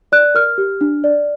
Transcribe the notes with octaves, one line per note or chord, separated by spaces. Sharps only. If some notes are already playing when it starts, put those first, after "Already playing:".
D5 F#6
A#4 F6
G4
D4
D5